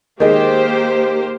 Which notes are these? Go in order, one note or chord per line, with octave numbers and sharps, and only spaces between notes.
D#3 G#3 A#3 G4 C5